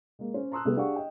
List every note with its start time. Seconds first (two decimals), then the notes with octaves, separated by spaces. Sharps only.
0.19 G#3 A#3
0.34 C#4 C5
0.52 A5 A#5 C6 D#6 E6 F#6
0.65 C3 G3 A3 B3
0.76 D4 G4 G#4 F5 F#5 C#6
0.96 D#5 G5